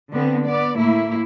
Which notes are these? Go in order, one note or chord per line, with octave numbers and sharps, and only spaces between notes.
D3 B3 C4
B3 D5
A2 A#3 E4